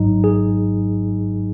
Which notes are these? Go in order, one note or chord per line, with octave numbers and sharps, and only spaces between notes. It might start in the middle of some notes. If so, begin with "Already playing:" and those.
Already playing: G#1 G#2 F#3 D#4
G#4